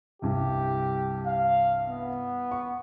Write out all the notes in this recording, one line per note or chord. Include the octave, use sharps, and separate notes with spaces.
C2 G2 G4
F5
B3
C#6